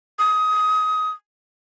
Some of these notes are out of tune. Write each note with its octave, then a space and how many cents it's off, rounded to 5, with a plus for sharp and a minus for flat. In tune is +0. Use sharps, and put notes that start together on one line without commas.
D#6 +20